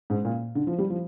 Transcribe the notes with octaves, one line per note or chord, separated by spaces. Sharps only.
G#2
A#2
D3
F3
G3
F3